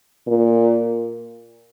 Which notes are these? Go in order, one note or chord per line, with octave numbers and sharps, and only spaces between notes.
A#2